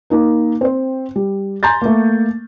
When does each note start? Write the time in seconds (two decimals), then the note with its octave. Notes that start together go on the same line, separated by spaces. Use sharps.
0.10 A#3 D#4 A#4
0.61 C4 C5
1.16 G3
1.63 G#5 A#5 C6 G6 A6
1.82 A3 A#3